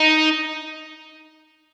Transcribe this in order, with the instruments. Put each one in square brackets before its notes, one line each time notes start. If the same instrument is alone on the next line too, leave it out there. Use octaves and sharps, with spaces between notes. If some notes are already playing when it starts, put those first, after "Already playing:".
Already playing: [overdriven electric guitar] D#4